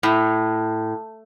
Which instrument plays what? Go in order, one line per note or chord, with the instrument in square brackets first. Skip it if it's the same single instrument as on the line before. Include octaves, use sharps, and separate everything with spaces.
[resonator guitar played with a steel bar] A2